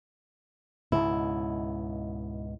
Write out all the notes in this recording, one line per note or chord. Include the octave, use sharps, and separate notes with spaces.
C#2 G#2 B2 E4